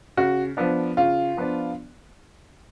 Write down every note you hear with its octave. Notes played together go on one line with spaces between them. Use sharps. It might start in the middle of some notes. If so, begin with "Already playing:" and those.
C#3 F#4
F3 B3 D4
C#3 F4
F3 B3 D4